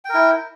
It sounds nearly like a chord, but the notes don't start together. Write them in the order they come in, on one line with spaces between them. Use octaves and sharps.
G5 A#4 E4